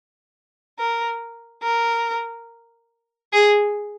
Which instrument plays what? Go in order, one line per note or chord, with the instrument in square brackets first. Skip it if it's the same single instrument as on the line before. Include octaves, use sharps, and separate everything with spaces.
[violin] A#4
A#4
G#4